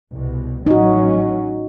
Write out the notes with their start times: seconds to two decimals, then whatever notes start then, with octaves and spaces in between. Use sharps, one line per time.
0.11 C2 B2
0.67 A1 F#3 C#4 D#4 F#4